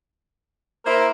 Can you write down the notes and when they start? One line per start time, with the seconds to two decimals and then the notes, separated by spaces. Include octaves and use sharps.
0.86 A#3 E4 A#4 C5